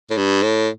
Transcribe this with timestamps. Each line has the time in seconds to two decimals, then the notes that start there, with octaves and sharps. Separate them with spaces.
0.10 A2
0.17 G2
0.43 A2